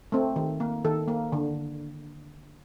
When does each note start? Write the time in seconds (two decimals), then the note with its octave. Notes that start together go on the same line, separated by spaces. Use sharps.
0.12 A3 C4
0.36 D#3
0.60 A#3
0.85 D#3 A4
1.08 A#3
1.32 D3